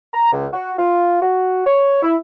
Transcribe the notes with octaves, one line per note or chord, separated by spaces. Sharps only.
A#5
C#2
F#4
F4
F#4
C#5
E4